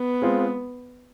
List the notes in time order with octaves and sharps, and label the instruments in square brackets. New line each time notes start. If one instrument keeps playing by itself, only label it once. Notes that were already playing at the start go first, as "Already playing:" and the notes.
Already playing: [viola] B3
[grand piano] G#3 C4 F4